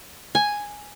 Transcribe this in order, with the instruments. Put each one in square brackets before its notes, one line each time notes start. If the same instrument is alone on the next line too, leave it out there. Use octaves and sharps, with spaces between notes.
[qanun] G#5